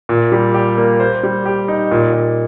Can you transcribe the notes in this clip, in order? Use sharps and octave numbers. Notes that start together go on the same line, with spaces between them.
A#2
G3
G4
A#3
C5
G3
G4
D#4
A#2
A#2